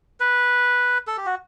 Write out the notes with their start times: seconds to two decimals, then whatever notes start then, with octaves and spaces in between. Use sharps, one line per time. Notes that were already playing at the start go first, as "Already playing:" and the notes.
0.20 B4
1.07 A4
1.17 G4
1.26 F#4